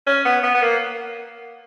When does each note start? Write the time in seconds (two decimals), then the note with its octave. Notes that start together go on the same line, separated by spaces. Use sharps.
0.07 C#4
0.25 B3
0.44 B3
0.54 B3
0.63 A#3